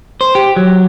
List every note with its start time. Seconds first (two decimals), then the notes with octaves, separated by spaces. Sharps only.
0.21 C5
0.35 G4
0.56 F#3